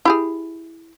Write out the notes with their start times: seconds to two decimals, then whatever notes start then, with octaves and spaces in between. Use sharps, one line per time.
0.05 E4 G4 G#4